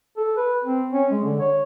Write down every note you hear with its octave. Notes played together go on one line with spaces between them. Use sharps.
A4
B4
C4
C#4
G#3
D3
C#5